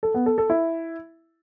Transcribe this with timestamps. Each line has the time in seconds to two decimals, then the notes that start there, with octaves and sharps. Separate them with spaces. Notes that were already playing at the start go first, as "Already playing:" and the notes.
0.03 A4
0.15 B3
0.26 A4
0.38 A4
0.50 E4